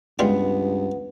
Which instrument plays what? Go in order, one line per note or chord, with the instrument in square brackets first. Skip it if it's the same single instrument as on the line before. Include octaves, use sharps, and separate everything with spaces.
[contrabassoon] C#2 [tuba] G2 [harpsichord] G3 G#3 F4 [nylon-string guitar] B3